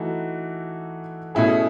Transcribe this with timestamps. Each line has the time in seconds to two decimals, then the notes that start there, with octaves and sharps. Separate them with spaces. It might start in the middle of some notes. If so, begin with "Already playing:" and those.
Already playing: E3 A3 D#4 F#4 A4
1.35 B2 A3 C#4 E4 G#4